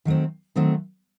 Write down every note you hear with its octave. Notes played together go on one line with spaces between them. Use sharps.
D#3 F#3 A3 C4
D#3 F#3 A3 C4